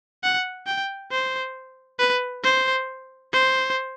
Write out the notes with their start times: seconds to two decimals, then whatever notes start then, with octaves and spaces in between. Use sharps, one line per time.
0.23 F#5
0.67 G5
1.11 C5
1.99 B4
2.44 C5
3.33 C5